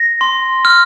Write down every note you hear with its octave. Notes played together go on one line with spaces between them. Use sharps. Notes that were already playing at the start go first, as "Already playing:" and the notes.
Already playing: A#6
C6
F6